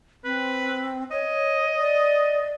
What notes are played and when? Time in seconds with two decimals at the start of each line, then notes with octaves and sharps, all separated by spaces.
0.24 C4 B4
1.11 C#5 D#5
1.78 D5